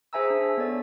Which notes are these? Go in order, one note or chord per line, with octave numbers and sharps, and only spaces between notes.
G#4 C5 E5 G#5 A#5 E6
D4
B3 A4 C#5 D5